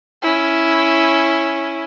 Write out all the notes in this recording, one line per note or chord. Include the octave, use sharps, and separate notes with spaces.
C#4 E4